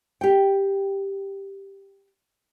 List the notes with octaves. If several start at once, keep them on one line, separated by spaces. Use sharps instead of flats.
G4 G5